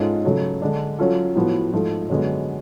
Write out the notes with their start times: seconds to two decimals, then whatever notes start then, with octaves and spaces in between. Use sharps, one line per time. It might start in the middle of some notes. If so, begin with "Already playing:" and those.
Already playing: G#2 G#3 C#4 F4 A4
0.25 C#3 F#3 A3
0.62 D3 G#3 D4
0.99 F#3 C#4 F4 A4
1.35 A2 F3 B3 F#4
1.73 G#2 F3 A3
2.10 F#2 D3 G#3 B3 F#4